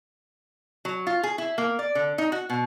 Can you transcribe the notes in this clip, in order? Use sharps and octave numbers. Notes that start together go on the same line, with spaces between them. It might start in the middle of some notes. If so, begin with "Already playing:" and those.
F#3
F4
G#4
E4
A#3
D5
D3
D#4
F#4
B2